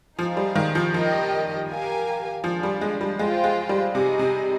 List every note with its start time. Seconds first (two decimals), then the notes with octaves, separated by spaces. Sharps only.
0.18 F3 D#4 G#4 C5 F5
0.37 G3
0.56 D#3
0.75 F3
0.94 F3 G4 A#4 D#5 G5
1.68 G4 A#4 F5 G#5
2.44 F3 D4 F4 G#4
2.63 G3
2.81 G#3
3.01 G3
3.19 G#3 F4 C5 G5
3.44 G#3
3.69 G3
3.95 C3 D#4 G#4 D#5
4.19 C3